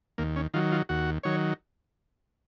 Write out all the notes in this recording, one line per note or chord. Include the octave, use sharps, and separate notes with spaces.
D#2 A#3
C#4
D#3 F#3 F4
F4
D#2 F#4
D#3 F#3 C#5